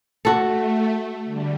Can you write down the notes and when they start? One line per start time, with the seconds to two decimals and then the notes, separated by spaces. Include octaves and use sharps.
0.25 A3 F#4 A4
1.24 D3 G3